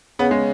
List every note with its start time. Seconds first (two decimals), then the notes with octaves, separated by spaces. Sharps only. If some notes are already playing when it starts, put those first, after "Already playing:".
0.19 C#3 B3
0.31 G#3